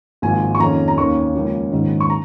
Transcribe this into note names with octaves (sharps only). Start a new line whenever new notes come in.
G#1 G#2 F3 A#3 G#5
C#6
F2 D#3 A#3 C#4 A#5
A#5
D#2 D#3 A#3 C#4 C#6
C#2 C#3 F3 A#3 C#4
A#1 G#2 D#3 C#4
C#6
A#5